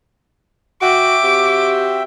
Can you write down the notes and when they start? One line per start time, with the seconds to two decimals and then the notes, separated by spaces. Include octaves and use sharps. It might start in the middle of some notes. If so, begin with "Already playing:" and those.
0.82 F#4 E5 G5 D6
1.24 C4 F#4 G4